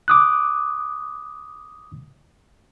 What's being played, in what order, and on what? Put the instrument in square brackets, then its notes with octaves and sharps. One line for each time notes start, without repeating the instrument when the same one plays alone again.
[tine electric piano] D6 D#6 F#6